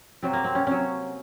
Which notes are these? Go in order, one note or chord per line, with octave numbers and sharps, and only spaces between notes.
C3 F#3 C4
A#3
C4
C#4
C3 F#3 C#4